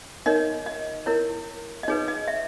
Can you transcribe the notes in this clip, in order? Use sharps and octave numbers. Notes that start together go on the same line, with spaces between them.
D#4 A#4 C#5 D#5
D#5
E4 A#4 C#5
D#5
D#4 G#4 B4 C#5
D#5
E5